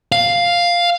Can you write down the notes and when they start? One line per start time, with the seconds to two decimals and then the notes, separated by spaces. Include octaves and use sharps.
0.12 F5